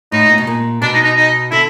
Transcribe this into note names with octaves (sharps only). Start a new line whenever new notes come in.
A2 D#4
A#2
B2
A#2
B2 D4
D#4
D#4
D#4
D3 E4